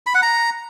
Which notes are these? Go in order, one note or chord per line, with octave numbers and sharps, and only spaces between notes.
B5
F#5
A#5